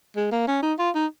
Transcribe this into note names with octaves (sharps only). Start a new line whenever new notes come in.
G#3
A#3
C#4
D#4
F4
D#4